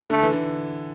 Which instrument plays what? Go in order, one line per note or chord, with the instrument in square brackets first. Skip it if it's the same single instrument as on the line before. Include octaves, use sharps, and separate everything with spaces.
[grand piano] D3 [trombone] A3
[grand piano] E3
D3